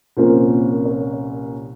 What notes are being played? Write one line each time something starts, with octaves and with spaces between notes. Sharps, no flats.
C2 A#2 F3 A#3 C#4 C5
C#5